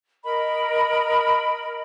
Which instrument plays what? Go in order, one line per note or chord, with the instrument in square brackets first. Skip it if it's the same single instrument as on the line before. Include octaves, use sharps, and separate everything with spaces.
[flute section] A#4 D#5 B5